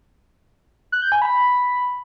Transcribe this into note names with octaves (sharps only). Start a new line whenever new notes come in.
F#6
G6
G#5
B5